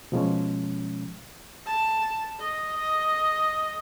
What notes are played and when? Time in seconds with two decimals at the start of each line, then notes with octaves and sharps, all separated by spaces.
0.12 B2 F3 G#3 C#4
1.66 A5
2.39 D#5
2.77 D#5